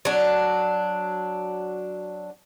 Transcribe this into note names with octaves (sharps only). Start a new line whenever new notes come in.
F#3 D4